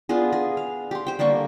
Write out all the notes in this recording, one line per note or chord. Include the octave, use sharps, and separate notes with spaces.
B3 D4 F4 G#4
G#4
F5
G4 C6
C5 G5
D3 G3 A#3 C#6